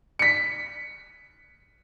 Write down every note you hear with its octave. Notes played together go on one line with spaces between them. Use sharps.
B6 C#7